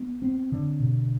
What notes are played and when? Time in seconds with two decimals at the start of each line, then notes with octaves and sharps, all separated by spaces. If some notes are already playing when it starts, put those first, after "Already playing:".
Already playing: B3
0.22 C4
0.52 D3
0.80 B2